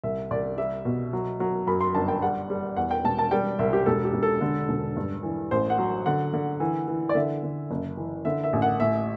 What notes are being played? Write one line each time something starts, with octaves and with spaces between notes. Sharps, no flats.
C2 E5
C2 D5
G3 E5
B2
F#3
F#3
F#2 B5
C6
G1 A5
G5
G3 F#5
G3
E2 F#5
G5
E1 A5
A5
G3 G5
C2 E5
G4
E1 A4
G4
E1
A4
D3
E1
G2
E3
A1 C5
F#5
F#3
D3 F#5
D3
E3
E3
D5
D3 E5
D3
F#1
E3
D3 E5
E5
A1
F#5
A2 E5